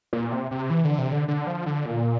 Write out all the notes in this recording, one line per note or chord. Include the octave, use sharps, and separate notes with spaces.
A#2
C3
C3
E3
D3
C3
D3
D3
F3
D3
A#2